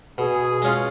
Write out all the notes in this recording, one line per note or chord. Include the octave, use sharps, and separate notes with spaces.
B2 G#4
G#3 C#4 F4